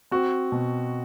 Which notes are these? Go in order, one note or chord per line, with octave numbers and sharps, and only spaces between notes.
C4 F#4
B2